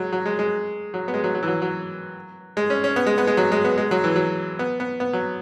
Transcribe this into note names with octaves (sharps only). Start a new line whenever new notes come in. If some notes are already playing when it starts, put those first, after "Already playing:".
Already playing: F#3 G#3
F#3
G#3
G#3
F#3
B3
G#3
F#3
F#3
E3
F#3
F#3
G#3
C#4
C#4
B3
G#3
B3
G#3
F#3
G#3
B3
G#3
F#3
E3
F#3
B3
B3
B3
F#3